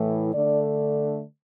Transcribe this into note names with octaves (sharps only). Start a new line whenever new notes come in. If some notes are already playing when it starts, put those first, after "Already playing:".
Already playing: A2 E3 A3
D3 A3 D4 D5